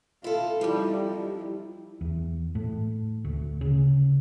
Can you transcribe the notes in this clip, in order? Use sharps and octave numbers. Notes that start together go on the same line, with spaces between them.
E4 F4 A4
F2 F3 G3 D#4 E4
E4
E2
A2
D2
C#3